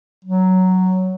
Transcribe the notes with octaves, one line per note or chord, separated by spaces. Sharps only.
F#3